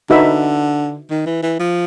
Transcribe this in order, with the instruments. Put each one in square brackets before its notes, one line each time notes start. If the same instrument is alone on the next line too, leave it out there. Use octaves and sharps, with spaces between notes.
[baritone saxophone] D3 [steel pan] D#4 F#4 B4 E5
[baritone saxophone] D#3
E3
E3
F3